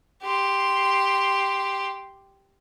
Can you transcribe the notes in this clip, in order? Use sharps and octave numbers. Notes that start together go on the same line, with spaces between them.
G4 C6